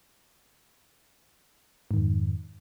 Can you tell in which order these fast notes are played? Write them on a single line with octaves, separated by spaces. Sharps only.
G#2 D#3 F2